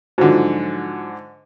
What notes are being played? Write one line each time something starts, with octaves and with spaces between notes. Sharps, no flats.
G#2 D3 F3 F#3